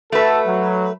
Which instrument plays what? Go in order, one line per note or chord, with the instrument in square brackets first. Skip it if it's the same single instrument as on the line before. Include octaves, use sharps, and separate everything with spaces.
[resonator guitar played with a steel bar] A3 B4 [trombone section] F#4 A4
[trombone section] F#3